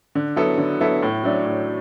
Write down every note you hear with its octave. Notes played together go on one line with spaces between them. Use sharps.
D3
F#3 B3 E4 A4
D3
F#3 B3 E4 A4
A2
F#3 A3 D4
A2